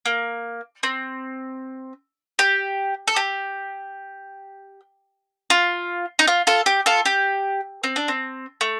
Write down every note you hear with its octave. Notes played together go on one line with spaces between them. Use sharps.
A#3
C4
G4
A4
G4
F4
D#4
F4
F4 A4
G4
F4 A4
G4
C4
D4
C4
A3